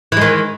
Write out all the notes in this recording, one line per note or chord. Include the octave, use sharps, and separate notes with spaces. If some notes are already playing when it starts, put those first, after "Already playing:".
D#3 E3 G#3